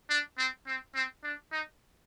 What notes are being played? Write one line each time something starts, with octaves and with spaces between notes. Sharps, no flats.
D4
C4
C4
C4
D4
D#4